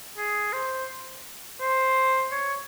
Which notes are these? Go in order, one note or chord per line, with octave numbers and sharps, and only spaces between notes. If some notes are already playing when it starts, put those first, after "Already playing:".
G#4
C5
C5
C#5